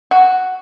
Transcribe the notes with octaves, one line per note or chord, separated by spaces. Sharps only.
F#4